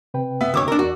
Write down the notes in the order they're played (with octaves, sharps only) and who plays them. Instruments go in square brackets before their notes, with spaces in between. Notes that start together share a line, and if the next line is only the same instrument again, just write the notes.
[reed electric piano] C3 B4 G5
[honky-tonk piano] B3 E5
[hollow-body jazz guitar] D2 C#5 [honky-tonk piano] D6 E6
[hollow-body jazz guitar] D4 A#4
[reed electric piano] E2 D4 D5 [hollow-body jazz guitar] F#4